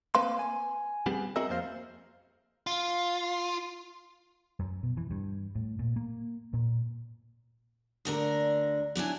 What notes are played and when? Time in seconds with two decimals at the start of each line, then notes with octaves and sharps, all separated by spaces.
0.15 A#3 C4 B4 F5 C6
0.39 G#5
1.06 G3 B3 C4 G4 G#4
1.36 C4 F#4 G#4 A#4 D#5 E5
1.49 F2 A#3 C5 F5
2.67 F4
4.59 F#2
4.83 B2
4.97 E3
5.11 G2
5.55 A2
5.79 A#2
5.96 A#3
6.53 A#2
8.05 D2 D3 A#4
8.96 F#3 D4 E4 G#5